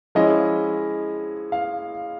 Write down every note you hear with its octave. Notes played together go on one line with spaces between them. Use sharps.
F3 G#3 C#4 E4 D#5
F5